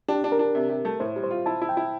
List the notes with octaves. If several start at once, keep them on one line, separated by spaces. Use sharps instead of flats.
D4 G4
D4
A#4
D4
C3
C3
A3
A2 C5
G3
C5
F4
E4 A5
E4
G5
E4